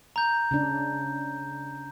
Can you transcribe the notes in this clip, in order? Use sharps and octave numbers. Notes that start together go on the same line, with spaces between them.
A#5 G6
C#3 D4